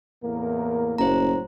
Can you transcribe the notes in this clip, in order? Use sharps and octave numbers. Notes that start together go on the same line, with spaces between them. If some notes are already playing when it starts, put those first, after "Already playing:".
E2 A2 A#3 A#4
F#1 A2 F#3 C5 A#5